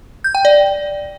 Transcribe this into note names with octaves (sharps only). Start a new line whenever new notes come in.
G6
G5
D5